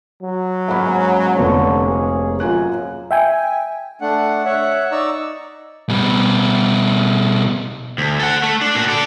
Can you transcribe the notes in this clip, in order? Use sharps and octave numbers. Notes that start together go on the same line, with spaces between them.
F#3
G#2 A#3 C#4 F#5 G#5 B5
F1 D3 F3 B4 C#5
G#4
F#2 F4 G#5 F#6
E5 G5 G#5
A3 D4 F#5
C#5 E5 F#5
D#4 D5 A#5 C#6 E6
B2 G3
D2
A4 F#5
A3
D4
A#2 F#4
A4 D5